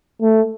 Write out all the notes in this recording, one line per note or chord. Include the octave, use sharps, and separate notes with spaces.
A3